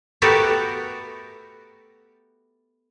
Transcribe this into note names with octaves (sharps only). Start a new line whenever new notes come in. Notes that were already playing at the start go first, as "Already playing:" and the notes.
A3 B3 F#4 G4 A4 A#4